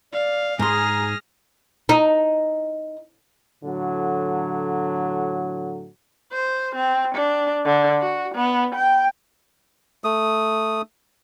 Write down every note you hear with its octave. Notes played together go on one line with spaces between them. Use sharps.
D5 F5
G#2 G#4 A#5 C6 F6 A#6
D#4
A2 D3 F#3
C5
C4
D4
D3
F#4
B3
G5
A3 D#6